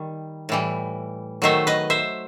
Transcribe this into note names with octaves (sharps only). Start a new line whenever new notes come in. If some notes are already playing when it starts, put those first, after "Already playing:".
Already playing: D#3 G3
A2 E3 G3
D#3 F#3 A3 C5 E5
B4 D#5
C5 E5